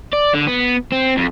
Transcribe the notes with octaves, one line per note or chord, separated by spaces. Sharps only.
D5
D3
B3
C4
F2